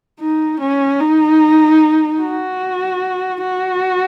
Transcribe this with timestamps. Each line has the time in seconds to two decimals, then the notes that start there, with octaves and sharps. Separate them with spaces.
0.20 D#4
0.60 C#4
1.00 D#4
2.21 F#4
3.43 F#4